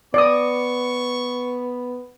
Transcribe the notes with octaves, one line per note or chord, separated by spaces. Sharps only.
B3 D5 C#6 D#6